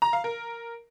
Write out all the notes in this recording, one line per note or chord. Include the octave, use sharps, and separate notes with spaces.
A#5
F5
A#4